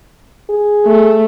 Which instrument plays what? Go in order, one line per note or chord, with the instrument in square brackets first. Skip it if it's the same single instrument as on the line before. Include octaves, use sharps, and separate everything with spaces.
[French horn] G#4
[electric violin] A3